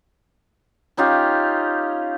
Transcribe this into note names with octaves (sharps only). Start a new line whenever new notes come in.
C#4 D#4 F4 G4